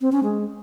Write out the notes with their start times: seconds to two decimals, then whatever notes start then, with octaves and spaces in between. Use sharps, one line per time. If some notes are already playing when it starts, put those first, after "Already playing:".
0.01 C4
0.12 C#4
0.24 G#3